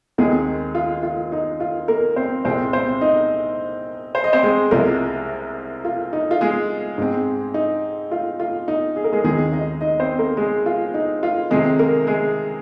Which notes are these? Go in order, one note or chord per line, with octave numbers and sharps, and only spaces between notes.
D#2 D#3 G#3 C4 G#4
F4
F4
D#4
F4
A#3 A#4
C4 C5
C2 A#2 G#3 C4 C5
C4 C5
D#4 D#5
C5
D#5
C4 C5
G#3 G#4
C2 C3 F3 G#3 A#3 A#4
F4
D#4
F4
G#3 G#4
G#2 G#3 C4
D#4
F4
F4
D#4
G#4
A#4
G#3 G#4
D#2 D#3 G#3 C4 G#4
D#4 D#5
D#4 D#5
C4 C5
A#3 A#4
G#3 G#4
F4
D#4
F4
F2 C3 D#3 G#3 C4 G#4
A#3 A#4
G#3 G#4